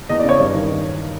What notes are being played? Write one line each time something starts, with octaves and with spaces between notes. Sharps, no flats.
E2 D#5
D5
C#3 C#5
G2
D#3